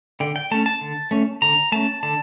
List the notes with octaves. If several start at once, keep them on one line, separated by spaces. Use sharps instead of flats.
D3 G5
G5
A3 C#4 A5
A5
D3
A3 C#4
D3 A#5
A3 C#4 A5
D3 A5